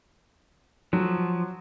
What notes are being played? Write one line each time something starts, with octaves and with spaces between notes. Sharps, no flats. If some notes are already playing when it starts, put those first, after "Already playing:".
F3 F#3